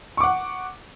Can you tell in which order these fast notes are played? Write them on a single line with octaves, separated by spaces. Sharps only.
C#6 D6 F#5